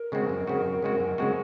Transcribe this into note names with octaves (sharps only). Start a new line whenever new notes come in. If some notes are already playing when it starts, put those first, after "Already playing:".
Already playing: A#4
C#3 G#3 C4 F#4
F#2
C#3 G#3 C4 F#4
F#2
C#3 G#3 C4 F#4
F#2
C#3 G#3 C4 F#4